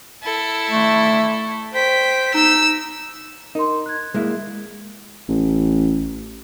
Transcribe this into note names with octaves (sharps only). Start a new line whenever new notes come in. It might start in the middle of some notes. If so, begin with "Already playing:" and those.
E4 A4
A3
C5 G5 B6
D#4 E6
D#4 A#4 C6
F#6 G#6
G#3 A#3 E4
A1